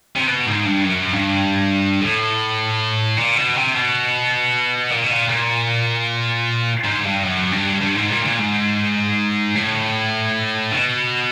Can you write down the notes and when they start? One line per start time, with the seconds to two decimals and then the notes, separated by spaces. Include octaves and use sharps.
0.16 C3
0.27 B2
0.46 G#2
0.65 G2
0.85 F#2
1.14 G2
2.01 A2
3.17 A#2
3.36 B2
3.56 C3
3.75 B2
4.91 A#2
5.04 B2
5.10 A#2
5.29 A#2
6.84 G#2
7.04 G2
7.23 F#2
7.52 G2
7.81 G2
7.96 G#2
8.10 A#2
8.25 A#2
8.39 G#2
9.55 A2
10.71 B2